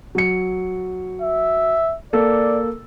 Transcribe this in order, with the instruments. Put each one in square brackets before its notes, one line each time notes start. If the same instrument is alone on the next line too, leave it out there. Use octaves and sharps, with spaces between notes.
[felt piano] F#3 C#7
[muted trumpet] E5
[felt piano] A#3 A4 [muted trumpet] D5